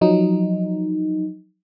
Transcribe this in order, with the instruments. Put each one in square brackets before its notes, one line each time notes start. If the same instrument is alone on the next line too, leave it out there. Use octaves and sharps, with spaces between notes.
[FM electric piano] F3 F#3 D#4